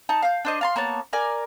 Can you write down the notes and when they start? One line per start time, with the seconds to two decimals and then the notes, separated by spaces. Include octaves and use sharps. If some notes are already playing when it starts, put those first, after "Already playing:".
0.09 D#4 A5
0.23 F5 G6
0.45 D4 C5 D#5
0.61 F5 A5 C6
0.76 A#3 B3 C#5 A5
1.13 A#4 D5 G#5